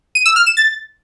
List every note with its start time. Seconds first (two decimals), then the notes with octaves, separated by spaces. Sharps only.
0.15 D#7
0.26 E6
0.36 F6
0.46 E7
0.57 A6